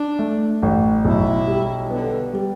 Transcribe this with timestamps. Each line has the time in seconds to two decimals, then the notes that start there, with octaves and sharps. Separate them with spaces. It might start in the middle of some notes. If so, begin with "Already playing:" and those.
Already playing: D4
0.19 A3
0.62 A1
1.05 B1 E4
1.47 G3
1.90 D3 B3
2.33 G3